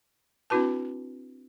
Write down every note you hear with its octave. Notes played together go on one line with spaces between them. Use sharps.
C4 D4 E4 F#4 B4 A5